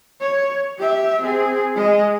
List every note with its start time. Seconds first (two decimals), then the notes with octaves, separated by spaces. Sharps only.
0.20 C#5
0.78 G4 E5
1.21 C4 G#4
1.76 G#3 D#5